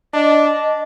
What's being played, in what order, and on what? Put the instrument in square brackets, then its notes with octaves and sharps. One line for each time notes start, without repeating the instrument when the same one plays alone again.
[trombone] D4 [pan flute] D#5